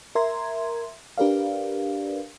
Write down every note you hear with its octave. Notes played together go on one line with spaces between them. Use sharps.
A#4 E5 A#5 C6 G#6
D4 G4 A#4 B4 D5 F5